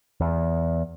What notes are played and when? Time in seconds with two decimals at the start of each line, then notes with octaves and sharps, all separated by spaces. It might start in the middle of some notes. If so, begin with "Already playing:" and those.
0.20 E2